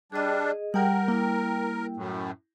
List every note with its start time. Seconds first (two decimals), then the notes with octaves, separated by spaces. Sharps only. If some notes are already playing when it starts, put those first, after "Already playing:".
0.12 G3 D4 G#4 D#5
0.74 G3 A#4 F#5 G5
1.08 A#3 E4
1.97 F#2 A2